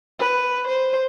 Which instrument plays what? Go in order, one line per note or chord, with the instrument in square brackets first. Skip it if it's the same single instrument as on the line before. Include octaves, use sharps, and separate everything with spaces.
[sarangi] B4
C5